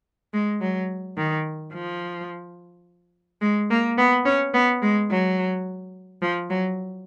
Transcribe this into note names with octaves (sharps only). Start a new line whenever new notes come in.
G#3
F#3
D#3
F3
G#3
A#3
B3
C#4
B3
G#3
F#3
F3
F#3